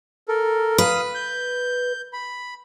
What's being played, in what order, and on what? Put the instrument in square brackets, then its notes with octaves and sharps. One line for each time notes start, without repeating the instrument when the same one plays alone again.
[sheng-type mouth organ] A4 A#4
[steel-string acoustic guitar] B4 [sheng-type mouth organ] F5 D#6
[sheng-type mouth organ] G6
B5